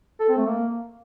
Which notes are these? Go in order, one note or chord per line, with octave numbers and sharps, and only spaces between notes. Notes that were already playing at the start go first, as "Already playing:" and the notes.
A4
C4
A3
A#3